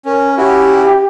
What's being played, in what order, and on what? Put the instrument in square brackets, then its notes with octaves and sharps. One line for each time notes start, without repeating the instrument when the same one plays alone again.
[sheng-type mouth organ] C#4 [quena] A#4
[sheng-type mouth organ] C#4 E4 F#4 [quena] G4